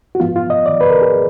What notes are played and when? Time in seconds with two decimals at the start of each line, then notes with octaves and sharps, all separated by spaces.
0.15 F#4
0.20 G#2 F3 B3 F4
0.36 F4
0.50 D#5
0.66 D5
0.81 B4
0.90 A#4
1.02 G#4